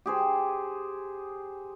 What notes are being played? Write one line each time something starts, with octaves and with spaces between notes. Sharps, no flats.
G4 G#4 C5